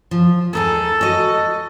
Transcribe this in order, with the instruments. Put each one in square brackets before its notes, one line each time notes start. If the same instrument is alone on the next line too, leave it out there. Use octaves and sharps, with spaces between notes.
[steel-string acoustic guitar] F3
[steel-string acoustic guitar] D#2 D#4 G#4 [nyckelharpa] A4
[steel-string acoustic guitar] F#4 D#5